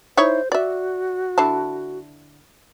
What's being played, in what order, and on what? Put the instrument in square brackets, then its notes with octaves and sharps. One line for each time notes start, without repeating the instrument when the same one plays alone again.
[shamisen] D#4 E4 C#5 [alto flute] C5
[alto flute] F#4 [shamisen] D5 E5
[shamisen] D3 E4 A5